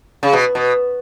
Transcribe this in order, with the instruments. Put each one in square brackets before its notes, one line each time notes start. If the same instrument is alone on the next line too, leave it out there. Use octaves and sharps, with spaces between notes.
[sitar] C#3
B2
B2